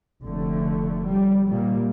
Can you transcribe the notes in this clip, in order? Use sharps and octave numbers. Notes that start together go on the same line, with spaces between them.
F1 D3 A3
G3
A#2 G3 A#3